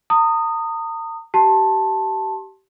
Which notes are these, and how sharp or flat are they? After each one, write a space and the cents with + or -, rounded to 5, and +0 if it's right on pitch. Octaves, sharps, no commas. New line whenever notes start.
A#5 -40 D#6 -10
G4 -30 A5 +0 C6 +30